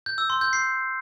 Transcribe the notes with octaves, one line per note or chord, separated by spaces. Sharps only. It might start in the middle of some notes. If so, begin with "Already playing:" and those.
G6
E6
C6
G6
C7